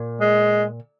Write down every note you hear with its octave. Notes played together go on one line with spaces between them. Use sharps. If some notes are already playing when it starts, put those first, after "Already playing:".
Already playing: A#2
G#3